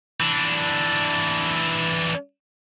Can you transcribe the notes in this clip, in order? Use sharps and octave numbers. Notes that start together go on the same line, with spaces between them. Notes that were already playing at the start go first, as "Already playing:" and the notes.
E3 D4